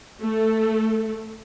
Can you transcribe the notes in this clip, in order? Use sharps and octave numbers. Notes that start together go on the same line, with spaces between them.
A3 A4